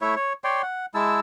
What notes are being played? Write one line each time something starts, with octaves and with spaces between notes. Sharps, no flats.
A3 E4 C#5 E5
C#5
C#5 D5 G5 C6
F#5
G#3 E4 A5 E6